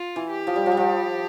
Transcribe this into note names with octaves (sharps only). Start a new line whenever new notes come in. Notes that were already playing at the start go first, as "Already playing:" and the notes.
Already playing: F4
E3
G4
F3
G3
F3
G3
F3